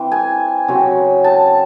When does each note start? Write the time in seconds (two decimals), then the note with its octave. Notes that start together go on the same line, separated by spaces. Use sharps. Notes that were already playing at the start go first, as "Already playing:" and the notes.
Already playing: E3 C4
0.12 G#5
0.68 C#3 F#3 C4
1.24 A5